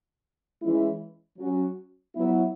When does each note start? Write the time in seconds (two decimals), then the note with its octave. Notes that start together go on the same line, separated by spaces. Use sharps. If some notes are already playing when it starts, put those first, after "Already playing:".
0.62 E3 G#3 C#4 E4
1.38 F#3 C#4 F#4
2.14 F#3 B3 E4